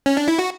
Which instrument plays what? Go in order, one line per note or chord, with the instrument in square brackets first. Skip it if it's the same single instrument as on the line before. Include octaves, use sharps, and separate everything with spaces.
[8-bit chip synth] C#4
D4
E4
F#4